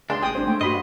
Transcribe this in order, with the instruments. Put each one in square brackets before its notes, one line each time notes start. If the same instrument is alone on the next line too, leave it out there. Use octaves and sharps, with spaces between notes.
[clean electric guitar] C#2 D4 [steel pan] G#4 C6
[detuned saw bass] A1 [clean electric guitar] G#3 [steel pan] G5 D#6
[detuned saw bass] G#1 [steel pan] D4 C5
[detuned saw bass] A3 [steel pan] G5
[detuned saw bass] G2 [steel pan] F#4 B5 C6 [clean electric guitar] D#5